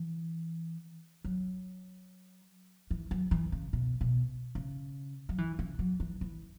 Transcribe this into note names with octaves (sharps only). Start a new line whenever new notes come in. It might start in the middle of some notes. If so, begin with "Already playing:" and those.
Already playing: E3
F#3
E3
F#3
E3
C#3
B2
B2
C#3
F#3
E3
C#3
F#3
E3
E3